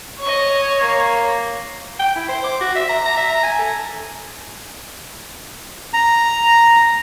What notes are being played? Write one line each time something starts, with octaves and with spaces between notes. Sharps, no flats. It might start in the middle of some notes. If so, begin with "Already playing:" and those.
C#5 D#5 C#6
A#3
G5
E4
C5
D6
F#4
E5
A#5
A#5
E5
A#5
G#5
A4
A#5